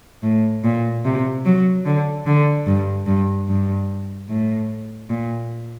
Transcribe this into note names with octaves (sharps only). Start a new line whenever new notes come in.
A2
A#2
C3
F#3
D3
D3
G2
G2
G2
A2
A#2